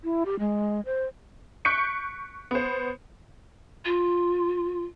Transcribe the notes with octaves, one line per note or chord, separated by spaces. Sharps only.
E4
G4
G#3
C5
C#6 F#6 G6 B6 C#7 D7
B3 C5
F4